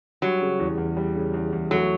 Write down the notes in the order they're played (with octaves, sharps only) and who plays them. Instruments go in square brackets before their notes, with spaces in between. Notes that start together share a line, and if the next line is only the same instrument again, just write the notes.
[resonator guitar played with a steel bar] F#3 [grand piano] G3
[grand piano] C#3
E2
E2
G3
C#3
E2
E2
[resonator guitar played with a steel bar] F#3 [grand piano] A3